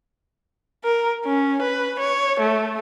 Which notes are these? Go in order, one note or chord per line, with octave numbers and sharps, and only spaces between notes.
A#4
C#4
B4
C#5
A3